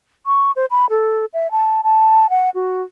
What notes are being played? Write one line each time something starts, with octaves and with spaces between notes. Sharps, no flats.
C#6
C5
B5
A4
E5
A5
A5
F#5
F#4